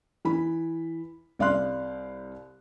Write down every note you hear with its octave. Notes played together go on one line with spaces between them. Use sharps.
E3 B5
C2 D5 F5 C6 F#6